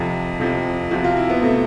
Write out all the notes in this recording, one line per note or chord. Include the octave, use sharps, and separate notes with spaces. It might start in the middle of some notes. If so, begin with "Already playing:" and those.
Already playing: F2 C3 F3
F2 C3 F3
F2 C3 F3 F#4
F4
E4
B3
C3 F3 A3